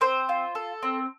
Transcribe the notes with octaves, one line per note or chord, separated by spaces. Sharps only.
C4 C5
F4
A4
C4